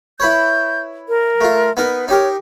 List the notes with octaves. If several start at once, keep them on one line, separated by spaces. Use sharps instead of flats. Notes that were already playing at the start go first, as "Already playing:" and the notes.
E4 B4 C#5 G6
A#4
A3 F4
B3 D#4 A#4 B4
D#4 G4 A#4 C#5